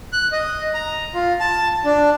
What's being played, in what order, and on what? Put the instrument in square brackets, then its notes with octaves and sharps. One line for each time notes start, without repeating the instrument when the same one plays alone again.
[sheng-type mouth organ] F#6
D#5
A#5
F4
A5
D4